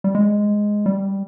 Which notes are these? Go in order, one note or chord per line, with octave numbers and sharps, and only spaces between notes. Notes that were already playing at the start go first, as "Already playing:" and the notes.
G3
G#3
G3